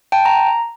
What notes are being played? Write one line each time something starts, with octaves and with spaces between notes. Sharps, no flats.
G5 A5
A#5